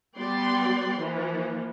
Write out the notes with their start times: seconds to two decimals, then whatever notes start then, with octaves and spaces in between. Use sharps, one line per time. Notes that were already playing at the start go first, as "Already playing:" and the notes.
0.18 G3 B3 D5 G5 C6
1.00 E3 F3 A#3